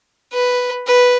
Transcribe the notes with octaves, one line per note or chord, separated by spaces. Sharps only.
B4
B4